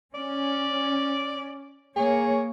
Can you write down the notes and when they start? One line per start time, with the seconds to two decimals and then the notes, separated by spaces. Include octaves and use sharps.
0.14 C#4 D5
1.96 A#3 G#4 C#5